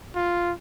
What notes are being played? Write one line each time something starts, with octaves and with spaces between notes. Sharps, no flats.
F4